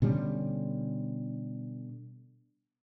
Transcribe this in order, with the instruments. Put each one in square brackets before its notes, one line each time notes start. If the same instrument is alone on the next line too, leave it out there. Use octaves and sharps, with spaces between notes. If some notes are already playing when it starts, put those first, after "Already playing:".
[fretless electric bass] B2 D3 G3 C#4